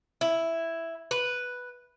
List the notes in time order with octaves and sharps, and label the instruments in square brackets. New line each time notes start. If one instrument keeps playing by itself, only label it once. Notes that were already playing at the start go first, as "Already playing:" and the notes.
[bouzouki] E4
B4